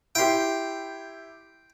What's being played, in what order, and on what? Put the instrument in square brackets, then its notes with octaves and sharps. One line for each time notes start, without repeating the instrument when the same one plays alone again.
[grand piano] E4 G4 [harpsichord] G5 C6